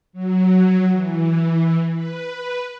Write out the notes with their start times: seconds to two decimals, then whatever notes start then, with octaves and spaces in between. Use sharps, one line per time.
0.13 F#3
0.91 E3
1.92 B4